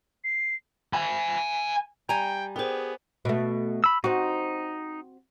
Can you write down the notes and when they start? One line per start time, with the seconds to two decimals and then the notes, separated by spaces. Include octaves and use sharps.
0.24 C7
0.93 G#5 B5
2.09 G3 G5 G#5 A#5
2.56 B3 G4 G#4 A#4 C5
3.25 B2 A3
3.84 B5 E6
4.04 C4 D#4 F#4